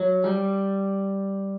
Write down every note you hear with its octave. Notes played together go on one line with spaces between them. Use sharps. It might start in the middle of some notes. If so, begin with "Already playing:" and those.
Already playing: F#3
G3